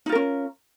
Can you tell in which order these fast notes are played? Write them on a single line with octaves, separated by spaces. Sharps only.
D#4 F4 A#4 C#4